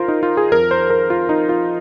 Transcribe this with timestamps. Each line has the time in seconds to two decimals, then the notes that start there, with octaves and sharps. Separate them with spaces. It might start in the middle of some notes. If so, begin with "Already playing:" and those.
Already playing: D#3 F4 A#4 C5
0.08 D#4
0.23 F4
0.37 G#4
0.52 F2 F3 A#4
0.71 C5
0.90 A#4
1.10 F4
1.29 D#4
1.49 F4